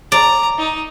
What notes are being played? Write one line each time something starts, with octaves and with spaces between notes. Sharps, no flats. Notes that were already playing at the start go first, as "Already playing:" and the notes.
D5 A#5
D#4